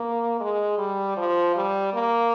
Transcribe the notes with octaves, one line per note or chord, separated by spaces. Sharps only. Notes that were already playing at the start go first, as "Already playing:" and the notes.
Already playing: A#3
G#3
G3
F3
G3
A#3